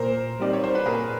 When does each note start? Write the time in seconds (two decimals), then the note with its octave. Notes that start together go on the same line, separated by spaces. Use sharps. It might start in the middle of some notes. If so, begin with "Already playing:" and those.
Already playing: A#2 A#4 C5
0.40 G3 C4 D#4 G4 D5
0.53 C#5
0.64 C5
0.75 B4
0.86 A#2 G#4 A#4